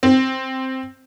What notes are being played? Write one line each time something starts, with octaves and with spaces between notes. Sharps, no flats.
C4